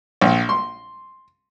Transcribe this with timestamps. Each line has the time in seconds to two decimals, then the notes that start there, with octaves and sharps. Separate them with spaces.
0.21 A#1
0.49 C6